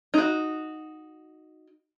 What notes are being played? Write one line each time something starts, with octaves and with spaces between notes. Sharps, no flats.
D#4 F#4